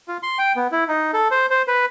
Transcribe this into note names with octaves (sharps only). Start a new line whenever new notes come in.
F4
C6
G5
B3
E4
D#4
A4
C5
C5
B4